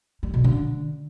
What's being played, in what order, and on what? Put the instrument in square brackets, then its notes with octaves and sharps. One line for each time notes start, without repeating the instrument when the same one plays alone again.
[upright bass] G3
B2
D3